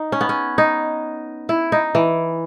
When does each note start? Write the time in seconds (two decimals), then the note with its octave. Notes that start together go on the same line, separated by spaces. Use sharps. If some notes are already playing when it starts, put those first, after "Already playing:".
Already playing: D#4
0.12 C#4
0.21 B3
0.29 C#4
0.58 D#4
1.49 E4
1.72 D#4
1.95 E3